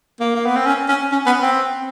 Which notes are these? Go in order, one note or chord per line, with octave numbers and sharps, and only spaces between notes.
A#3
A#3
B3
C4
C#4
C#4
C#4
B3
C4